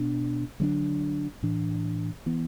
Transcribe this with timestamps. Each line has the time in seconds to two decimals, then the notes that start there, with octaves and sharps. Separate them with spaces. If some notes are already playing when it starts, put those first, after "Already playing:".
Already playing: B2 B3 D4
0.60 D3 F#3 B3 D4
1.43 A2 E3 D4
2.26 E3 B3